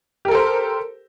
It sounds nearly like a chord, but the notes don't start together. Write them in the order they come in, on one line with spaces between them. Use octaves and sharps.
G4 A#4 A4 C5